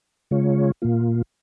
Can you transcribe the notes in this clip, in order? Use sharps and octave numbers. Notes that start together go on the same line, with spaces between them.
C#3 G#3 F4 C#5
A#2 A#3 F4